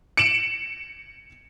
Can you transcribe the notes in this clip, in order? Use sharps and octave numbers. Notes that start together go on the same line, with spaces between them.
C#7 D7 E7 F#7